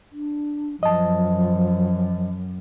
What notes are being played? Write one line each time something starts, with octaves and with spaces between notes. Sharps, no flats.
D4
F#2 F3 D#5 A5